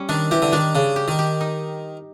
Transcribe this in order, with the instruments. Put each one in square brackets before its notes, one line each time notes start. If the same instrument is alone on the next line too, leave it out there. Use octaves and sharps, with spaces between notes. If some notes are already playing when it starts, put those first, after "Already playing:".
Already playing: [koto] G3 C#4
[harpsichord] D#3 [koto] D4
[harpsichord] E3 [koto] G4
[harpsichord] D3
[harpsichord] D#3 [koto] D4
[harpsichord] C#3 [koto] D4
[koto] G4
[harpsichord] D#3
[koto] G4
D#4